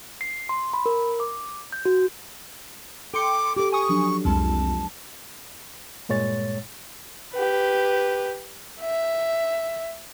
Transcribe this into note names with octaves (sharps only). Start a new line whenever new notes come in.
C7
C6
B5
A#4
D6
G6
F#4
A4 G5 C6 D6 C#7
G4 A4 D6
G#5 C#6 D#6
F3 F#3 D4
C2 F2 G#3 A5
G2 A#2 G#3 C#5 A6
G4 B4
E5